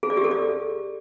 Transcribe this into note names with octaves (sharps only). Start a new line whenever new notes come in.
G#4
D5
G4
A4
D5